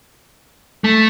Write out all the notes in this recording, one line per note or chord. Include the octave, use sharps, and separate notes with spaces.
A3